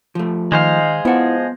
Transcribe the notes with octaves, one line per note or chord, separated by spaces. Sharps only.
F3 A3
D#3 G#3 D#4 C5 F5
F3 B3 E4 F#5